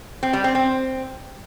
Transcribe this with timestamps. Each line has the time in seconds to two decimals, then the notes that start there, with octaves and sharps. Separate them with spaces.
0.23 C4
0.33 G3
0.44 C4
0.55 C4